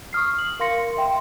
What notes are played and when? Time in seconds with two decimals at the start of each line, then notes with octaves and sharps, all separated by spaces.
0.13 C#6 D#6 F6 C7
0.39 F#7
0.59 A#4 F5 C6 A#6 C#7
0.97 E5 G5 C6